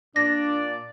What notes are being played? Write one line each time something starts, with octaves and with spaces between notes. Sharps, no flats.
A#2 D4 D5 A#6